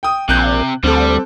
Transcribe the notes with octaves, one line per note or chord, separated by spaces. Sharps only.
G5 D#6
A#1 C3 F#6 G6
D2 G3 C4 A4